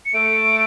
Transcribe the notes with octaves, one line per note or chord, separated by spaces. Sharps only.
C#7
A3 D7